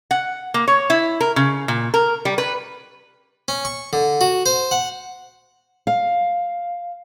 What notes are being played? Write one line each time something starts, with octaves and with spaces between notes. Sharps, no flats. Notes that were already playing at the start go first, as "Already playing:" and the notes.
F#5
A#3
C#5
E4
A#4
C#3
A#2
A#4
G3
B4
C#4
C#6
D3
F#4
C5
F#5
F5